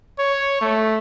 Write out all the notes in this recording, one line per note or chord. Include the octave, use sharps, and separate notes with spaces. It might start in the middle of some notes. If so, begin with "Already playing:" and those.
C#5
A3